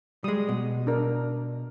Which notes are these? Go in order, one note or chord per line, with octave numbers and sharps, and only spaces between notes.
G3 G#3 D#6
B2
D4 A#4